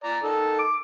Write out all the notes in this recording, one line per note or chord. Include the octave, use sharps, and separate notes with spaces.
D5 A#5
D#3 A4
D6